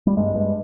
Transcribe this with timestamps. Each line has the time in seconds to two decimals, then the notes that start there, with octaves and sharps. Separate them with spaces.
0.07 G3
0.17 G2 G#3
0.35 G2